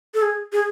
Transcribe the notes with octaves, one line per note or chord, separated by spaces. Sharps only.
A4
G#4
G#4